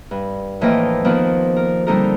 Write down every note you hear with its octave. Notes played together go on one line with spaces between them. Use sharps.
G2
A2 E3 F3 A#3 D#5 G5
D#3 F3 A#3 B3 D#4
A#4
D3 G3 C4 D#4 A4 A#4